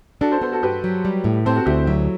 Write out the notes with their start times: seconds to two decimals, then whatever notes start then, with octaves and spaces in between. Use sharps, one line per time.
0.21 D4 F#4 A4
0.31 A4 C5
0.41 B3 A4 C5
0.52 F#4 A4
0.63 G2 G4 B4
0.84 F#3
1.05 G3
1.24 A2
1.45 C4 A4 C5
1.56 F#4 A4
1.66 D2 E4 G4
1.86 F#3 E4